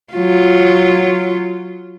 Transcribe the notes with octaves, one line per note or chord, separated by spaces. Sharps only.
F#3 F4